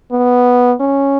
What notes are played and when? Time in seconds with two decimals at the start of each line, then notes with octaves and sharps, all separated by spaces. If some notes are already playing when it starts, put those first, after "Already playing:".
0.12 B3
0.81 C#4